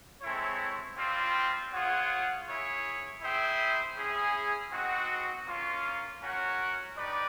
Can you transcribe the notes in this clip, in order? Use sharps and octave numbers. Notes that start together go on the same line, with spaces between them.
G#3 C4 E4 A4 C#5
G3 C4 F4
F4 G#4 C#5 F#5
E4 G#4 C#5
E4 G#4 C5 E5 G5
C#4 E4 G#4
C4 D#4 F#4
A#3 C#4 F4
C#4 F#4 A#4 C#5 F#5
D#4 G4 B4 D5